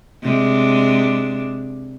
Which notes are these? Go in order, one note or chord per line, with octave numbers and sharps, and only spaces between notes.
C3 G#3 D4